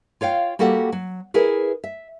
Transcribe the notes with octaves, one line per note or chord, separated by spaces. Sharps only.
F4 C#5 F5 G5
G3 A#3 F#4 G4 A4 F#5
F#3
E4 G#4 A#4 B4
E5